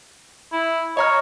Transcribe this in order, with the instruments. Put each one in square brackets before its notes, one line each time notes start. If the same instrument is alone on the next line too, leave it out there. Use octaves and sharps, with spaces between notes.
[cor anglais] E4
[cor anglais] C#5 [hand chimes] D#5 A#5 F6